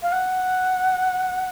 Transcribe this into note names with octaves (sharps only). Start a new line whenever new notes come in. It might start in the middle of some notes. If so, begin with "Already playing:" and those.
F5
F#5